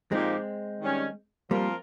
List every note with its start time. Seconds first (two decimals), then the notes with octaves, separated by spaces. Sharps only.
0.12 A#2 F3 G#3 A#3 C4 D#4 G4
0.82 D#3 G3 C#4
1.51 F3 G3 A#3 C4 F4 A#4